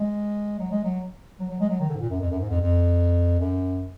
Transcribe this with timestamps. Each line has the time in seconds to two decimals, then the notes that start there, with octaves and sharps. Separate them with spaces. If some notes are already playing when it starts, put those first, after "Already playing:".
Already playing: G#3
0.59 F#3
0.71 G#3
0.84 F#3
1.39 F#3
1.49 F#3
1.60 G#3
1.69 F#3
1.80 D#3
1.89 D3
1.95 G#2
2.00 A#2
2.09 F#2
2.19 F2
2.30 F#2
2.40 G#2
2.50 F2
2.60 F2
3.40 F#2